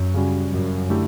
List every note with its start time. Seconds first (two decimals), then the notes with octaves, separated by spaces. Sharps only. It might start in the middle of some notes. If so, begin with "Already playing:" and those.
Already playing: F#2
0.14 C#3 G3 C#4 F#4
0.51 F#2
0.89 D3 A3 E4 G4